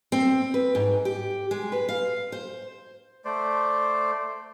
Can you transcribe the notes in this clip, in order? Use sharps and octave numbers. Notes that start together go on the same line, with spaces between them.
C4
B4
G#2
G4
G#3
B4
F5
C5
A3 C5 D5